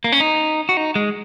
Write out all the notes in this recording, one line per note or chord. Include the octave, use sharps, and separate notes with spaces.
A#3
C#4
D#4
F#4
D#4
G#3